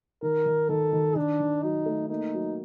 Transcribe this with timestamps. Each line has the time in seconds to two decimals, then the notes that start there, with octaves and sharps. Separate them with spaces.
0.22 D#3 A#4
0.46 D#3
0.69 D#3 A4
0.93 D#3
1.16 D#3 D4
1.40 D#3
1.63 F#3 D#4
1.86 A3
2.09 A#3 D#4
2.34 F#3